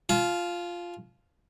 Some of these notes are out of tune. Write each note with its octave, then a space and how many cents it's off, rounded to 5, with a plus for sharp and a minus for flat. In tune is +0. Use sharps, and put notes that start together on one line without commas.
F4 +0 A5 -45